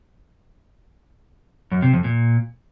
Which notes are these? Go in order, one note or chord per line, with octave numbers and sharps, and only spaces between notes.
F#2
C3
F2
A#2